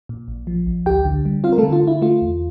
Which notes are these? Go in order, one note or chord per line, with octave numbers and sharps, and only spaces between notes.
A#2
A#1
F3
A#1
D2 G4 G5
D3
G3
C4 F4 F5
A#4
A3 A4
D3
F4
D3 E4
A3 F4
E2